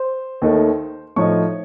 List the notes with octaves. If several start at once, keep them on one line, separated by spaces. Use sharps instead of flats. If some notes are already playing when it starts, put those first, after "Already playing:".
Already playing: C5
D#2 D#3 A3
A2 F3 A3 D#4 C#5 C#6